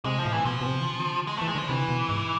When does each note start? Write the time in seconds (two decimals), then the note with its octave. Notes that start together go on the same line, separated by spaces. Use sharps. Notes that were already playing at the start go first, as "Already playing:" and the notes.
0.05 C3 G#3
0.19 F3
0.25 A2
0.32 E3
0.45 B2 F3
0.61 B2
0.66 C3
0.80 E3
0.87 D3
0.98 E3
1.07 D3
1.22 F3
1.27 E3 G#3
1.37 A3
1.42 E3
1.48 G#3
1.55 D3 F3
1.68 C3 E3
1.89 B2
2.09 G#2